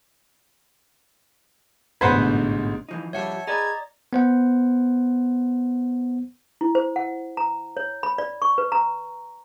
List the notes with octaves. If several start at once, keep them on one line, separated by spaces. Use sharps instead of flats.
A1 G#2 B2 D3 B4 C5 F#5 G#6
E3 F3 D#4
G2 F3 G3 C#5 E5 F#5 A5
G#4 B4 D5 D#5 A#5 G#6
B3 C5 F#5
E4
C5
F#5
A#5
C#5
B5
D5
C#6
B4
A#5